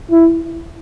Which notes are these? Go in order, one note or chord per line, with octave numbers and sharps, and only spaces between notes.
E4